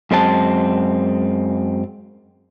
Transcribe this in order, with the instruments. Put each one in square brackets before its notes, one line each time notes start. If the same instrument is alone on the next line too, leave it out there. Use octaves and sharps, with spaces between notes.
[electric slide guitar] F#2 G#3 C4 A5